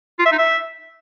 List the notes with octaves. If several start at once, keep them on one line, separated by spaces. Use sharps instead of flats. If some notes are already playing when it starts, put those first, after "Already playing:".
F4
E5
D#4
E5